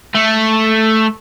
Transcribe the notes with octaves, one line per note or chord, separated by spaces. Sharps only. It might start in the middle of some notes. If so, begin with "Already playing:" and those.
A3